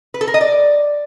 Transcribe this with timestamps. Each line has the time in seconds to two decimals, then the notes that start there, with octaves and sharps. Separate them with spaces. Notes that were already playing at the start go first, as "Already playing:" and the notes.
0.14 B4
0.21 A4
0.27 A#4
0.34 D#5
0.41 D5